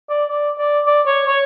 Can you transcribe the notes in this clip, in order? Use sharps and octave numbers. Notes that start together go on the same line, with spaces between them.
D5
D5
D5
D5
C#5
C#5